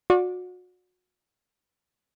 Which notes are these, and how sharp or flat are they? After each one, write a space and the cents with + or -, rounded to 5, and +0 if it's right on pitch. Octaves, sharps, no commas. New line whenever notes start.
F#4 -30 D5 +0